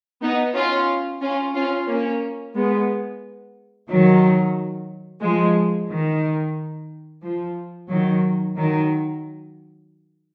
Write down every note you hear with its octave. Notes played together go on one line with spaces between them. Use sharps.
B3 D#4
C#4 F4
C#4 F4
C#4 F4
A#3 C#4
G#3 B3
D#3 F#3
F3 G#3
D#3
F3
D#3 F#3
D#3 F#3